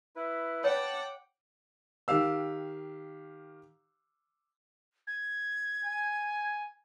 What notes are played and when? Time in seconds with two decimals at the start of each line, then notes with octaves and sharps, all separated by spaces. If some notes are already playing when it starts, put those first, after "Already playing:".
0.16 E4 B4
0.64 C#5 F#5 G5 A5 D6
2.08 D#3 G4 F5 E6
5.07 G#6
5.85 G#5